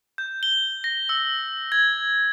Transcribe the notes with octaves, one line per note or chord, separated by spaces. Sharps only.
G6
G7
A#6
E6
G#6